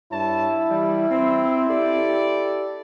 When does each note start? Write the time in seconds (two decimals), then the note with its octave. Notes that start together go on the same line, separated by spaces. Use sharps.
0.12 G2 E4 C#5 A5
0.70 E3 G3
1.10 C4
1.70 G4 A4 D5